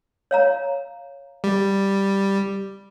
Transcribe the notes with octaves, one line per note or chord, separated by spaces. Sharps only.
C#5 F5 A#5
G3